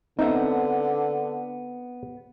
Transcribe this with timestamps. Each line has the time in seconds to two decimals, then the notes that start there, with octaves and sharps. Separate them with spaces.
0.19 D3 B3 C4 D#4 E5